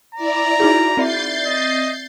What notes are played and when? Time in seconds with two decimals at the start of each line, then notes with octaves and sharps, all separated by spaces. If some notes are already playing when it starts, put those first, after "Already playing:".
0.15 E4 D5 A#5
0.60 D#4 F#4 G#4
0.97 C4 D5 E5 G6 A6 C7
1.47 D#5